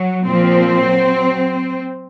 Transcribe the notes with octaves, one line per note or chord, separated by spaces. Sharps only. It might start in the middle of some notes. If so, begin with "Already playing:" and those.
Already playing: F#3
A#2 F3 C4
F#3